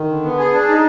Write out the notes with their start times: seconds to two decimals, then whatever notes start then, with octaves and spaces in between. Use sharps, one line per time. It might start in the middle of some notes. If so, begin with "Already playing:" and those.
Already playing: D#3
0.09 D3
0.24 B3
0.38 G#4
0.53 D4
0.68 D#4